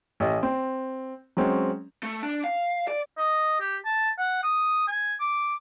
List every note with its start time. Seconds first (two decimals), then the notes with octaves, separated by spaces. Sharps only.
0.20 A1 D#5
0.43 C4
1.37 F#3 G#3 C4 C#4
2.03 A3
2.23 D4
2.44 F5
2.88 D5
3.18 D#5
3.61 G4
3.85 A5
4.18 F#5
4.43 D#6
4.88 G#5
5.20 D6